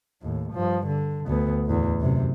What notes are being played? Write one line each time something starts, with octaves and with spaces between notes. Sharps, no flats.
D#2 A2
G2 F3
D3
D2 B3
A1 E2
F#2 C3